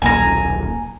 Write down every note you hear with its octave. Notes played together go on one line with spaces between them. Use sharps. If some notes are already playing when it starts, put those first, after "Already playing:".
D#1 B1 A#3 G#5 A#5